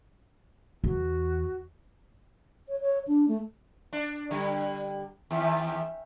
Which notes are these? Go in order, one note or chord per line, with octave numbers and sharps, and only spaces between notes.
E2 F#4
C#5
C#5
D4
A3
D4
D3 G3
D#2